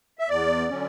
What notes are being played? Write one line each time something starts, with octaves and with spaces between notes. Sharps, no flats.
E5
E2 D5
D3 F#3 C#4